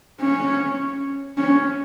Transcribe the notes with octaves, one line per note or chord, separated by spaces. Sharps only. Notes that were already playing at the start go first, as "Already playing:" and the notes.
C#4
C#4